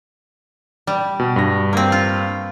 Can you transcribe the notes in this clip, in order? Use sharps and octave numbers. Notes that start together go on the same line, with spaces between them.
G3
B2
G2 A#6
A#3 C4
F4